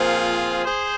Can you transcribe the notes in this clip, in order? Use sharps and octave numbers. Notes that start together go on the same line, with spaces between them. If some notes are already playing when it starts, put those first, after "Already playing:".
Already playing: A#2 F3 C4 F4 G#4
G#4 C5